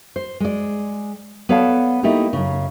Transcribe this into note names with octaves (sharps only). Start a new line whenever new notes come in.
C5
G#3 D5
B3 A4 C#5 D5 F5 A5
A3 A#3 D#4 E4 G4
F#2 C#3